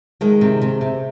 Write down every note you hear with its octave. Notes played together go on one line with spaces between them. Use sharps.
D#3 G#3
C3
C3
C3